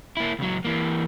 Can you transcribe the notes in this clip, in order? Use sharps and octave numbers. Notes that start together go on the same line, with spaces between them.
A#3 E4
C#2 F#3
E3 A#3